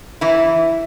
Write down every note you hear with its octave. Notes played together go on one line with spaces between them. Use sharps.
E3 E4